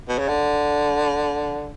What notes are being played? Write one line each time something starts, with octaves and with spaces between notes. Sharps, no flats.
B2
C#3
D3